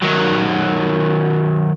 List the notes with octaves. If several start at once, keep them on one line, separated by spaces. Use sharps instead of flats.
D#3 F#3